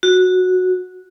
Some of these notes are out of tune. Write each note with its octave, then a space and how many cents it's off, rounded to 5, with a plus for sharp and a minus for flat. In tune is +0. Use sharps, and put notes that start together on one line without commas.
F#4 -10